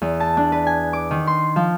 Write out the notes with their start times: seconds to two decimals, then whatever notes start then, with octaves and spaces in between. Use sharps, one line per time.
0.02 E2
0.20 A5
0.37 D4
0.52 B4
0.67 G#5
0.93 D6
1.11 D#3
1.27 C6
1.56 F3